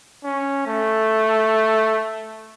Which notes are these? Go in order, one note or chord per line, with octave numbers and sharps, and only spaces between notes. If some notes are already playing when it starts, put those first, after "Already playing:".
C#4
A3